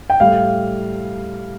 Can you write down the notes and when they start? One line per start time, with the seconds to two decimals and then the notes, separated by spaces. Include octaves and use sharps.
0.10 G5
0.20 A2 G3 F5